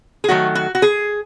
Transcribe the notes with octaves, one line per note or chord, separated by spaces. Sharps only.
G#4
D#3 F#3 A3 F#4
F#4
F#4
G#4